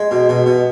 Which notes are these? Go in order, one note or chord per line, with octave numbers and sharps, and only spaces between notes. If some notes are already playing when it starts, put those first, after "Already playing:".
Already playing: G#3
B2
B2
B2